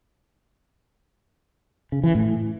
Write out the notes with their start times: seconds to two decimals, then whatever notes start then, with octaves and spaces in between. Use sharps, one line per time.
1.92 C#3
2.04 E3
2.15 A2